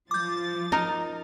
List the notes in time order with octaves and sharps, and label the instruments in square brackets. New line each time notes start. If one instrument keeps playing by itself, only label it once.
[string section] F3 A6 [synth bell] D6 G6
[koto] D#4 A#4